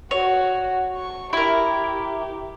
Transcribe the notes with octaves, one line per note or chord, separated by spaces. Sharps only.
F#4 C#5
C#6
E4 G4 A#4